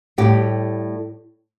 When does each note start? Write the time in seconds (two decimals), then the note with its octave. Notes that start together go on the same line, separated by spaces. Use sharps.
0.18 A2 G3 G4